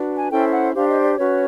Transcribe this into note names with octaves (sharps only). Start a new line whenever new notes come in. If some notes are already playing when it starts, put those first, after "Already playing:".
Already playing: D4 F#4 B4
G#5
C#4 E4 A4 C5 G5
F#5
D4 G4 C5 F5
D#5
D5
C#4 F#4 B4 C#5